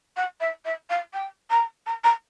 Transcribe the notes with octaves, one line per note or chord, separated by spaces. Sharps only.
F#5
E5
E5
F5
G5
A#5
A#5
A#5